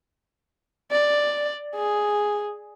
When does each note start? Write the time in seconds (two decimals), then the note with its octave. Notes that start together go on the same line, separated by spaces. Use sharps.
0.92 D5
1.75 G#4